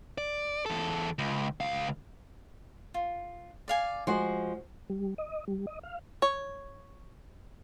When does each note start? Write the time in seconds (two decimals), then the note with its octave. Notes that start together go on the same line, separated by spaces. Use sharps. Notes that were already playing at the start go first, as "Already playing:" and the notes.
0.18 D5
0.66 E2 A4
1.19 C#2
1.60 C#2 F5
2.94 F4
3.68 D5 F5 G#5
4.07 F3 G#3 F#4 C6
4.90 G3
5.18 D#5
5.48 G3
5.67 D#5
5.83 F5
6.22 C#5